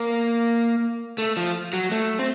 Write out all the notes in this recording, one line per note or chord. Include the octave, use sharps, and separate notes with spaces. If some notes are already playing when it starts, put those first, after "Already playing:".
Already playing: A#3
A3
F3
F#3
A3
C4